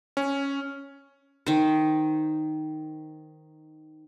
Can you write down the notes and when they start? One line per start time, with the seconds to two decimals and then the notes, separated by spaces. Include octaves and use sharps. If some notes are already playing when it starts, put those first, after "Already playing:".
0.17 C#4
1.46 D#3 C5